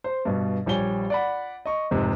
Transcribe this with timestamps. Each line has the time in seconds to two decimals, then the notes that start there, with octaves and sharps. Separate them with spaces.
0.04 C5
0.25 G2 B2
0.66 A#1 G3 C#5 G#5 G7
1.10 D5 F#5 B5
1.66 D#5 C#6
1.91 F1 G#2 C3